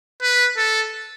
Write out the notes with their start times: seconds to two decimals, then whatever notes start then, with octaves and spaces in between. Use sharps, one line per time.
0.22 B4
0.57 A4